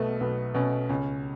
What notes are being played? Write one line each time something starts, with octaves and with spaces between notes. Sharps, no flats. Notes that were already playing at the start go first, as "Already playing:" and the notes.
Already playing: B1 B2 A3 B3
B1 B3
B2 C#4
C#2 C#4